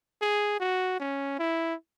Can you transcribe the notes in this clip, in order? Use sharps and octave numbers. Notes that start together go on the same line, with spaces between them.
G#4
F#4
C#4
E4